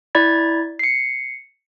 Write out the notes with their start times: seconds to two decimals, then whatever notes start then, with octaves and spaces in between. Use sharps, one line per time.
0.15 E4 D5 B5 G#6 A6
0.79 C7 C#7